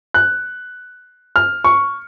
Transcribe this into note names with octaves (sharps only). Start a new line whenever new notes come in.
F#6
F6
C#6